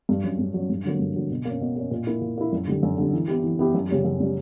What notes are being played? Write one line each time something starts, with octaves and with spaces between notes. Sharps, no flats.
G2
F#3 C#4
G2
F#3 C#4
G2
D3 F#3 A#3
G2
D3 F#3 A#3
B2
A#3 C#4
B2
A#3 C#4
A#2
A#3 E4
A#2
A#3 E4
F#2
D3 G3
F#2
D3 G3
E3
B3 E4 G4
E3
B3 E4 G4
F#2
C#3 G3 C#4 G4
F#2
C#3 G3 C#4 G4